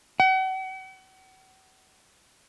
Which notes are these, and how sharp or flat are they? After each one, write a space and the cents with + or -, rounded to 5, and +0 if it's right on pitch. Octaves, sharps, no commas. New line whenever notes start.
F#5 +40